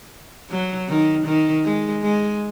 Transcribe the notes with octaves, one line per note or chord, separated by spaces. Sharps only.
F#3
D#3
D#3
G#3
G#3